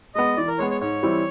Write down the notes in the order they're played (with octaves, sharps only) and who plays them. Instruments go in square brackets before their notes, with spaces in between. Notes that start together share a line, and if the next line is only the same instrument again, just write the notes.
[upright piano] G#3 B3 [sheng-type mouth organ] D#5
[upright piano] E3 [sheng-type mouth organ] D5
[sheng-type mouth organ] A#4
[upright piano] G#3 B3 [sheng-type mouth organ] C#5
[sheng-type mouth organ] C#5
[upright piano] G#2 [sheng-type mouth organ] C#5
[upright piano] E3 G3 C4 E4